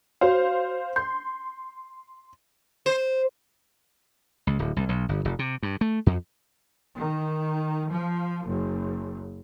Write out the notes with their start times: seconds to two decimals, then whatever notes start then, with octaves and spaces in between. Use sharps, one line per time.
0.21 F#4 C5 C#5 F5
0.96 C6 G6
2.86 C5
4.47 C#2
4.59 D1
4.76 C2
4.89 B1
5.09 G1
5.25 F1
5.39 C3
5.63 G2
5.81 A3
6.06 F2
6.97 D#3
7.90 F3
8.45 F#1